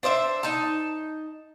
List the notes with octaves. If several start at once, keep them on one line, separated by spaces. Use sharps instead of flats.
D4 C5 D#5 E5
D#4 A5